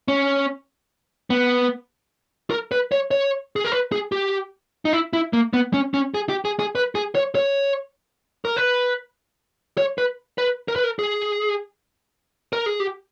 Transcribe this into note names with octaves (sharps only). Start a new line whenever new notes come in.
C#4
B3
A#4
B4
C#5
C#5
G#4
A#4
B4
G#4
G4
D#4
E4
E4
A#3
B3
C#4
C#4
G#4
G4
G#4
G#4
B4
G#4
C#5
C#5
A#4
B4
C#5
B4
B4
A#4
B4
A#4
G#4
A#4
G#4
G4